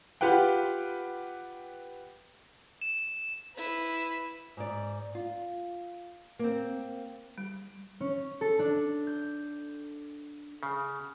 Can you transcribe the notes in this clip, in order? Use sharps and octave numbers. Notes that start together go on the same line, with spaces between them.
F4 G4 B4 F#5 G5
E7
E4 B4
G#2 D5
F4
A#3 C4
G3
C#4
A4
D4
G6
C#3